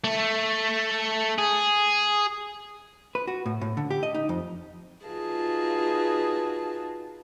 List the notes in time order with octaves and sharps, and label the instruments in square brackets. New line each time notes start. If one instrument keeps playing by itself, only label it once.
[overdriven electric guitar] A3
G#4
[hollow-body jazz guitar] B4
F#4
A2
A2
D3
G4
D#5
D#4
F2
[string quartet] D#4 F4 F#4 G#4 B4 A5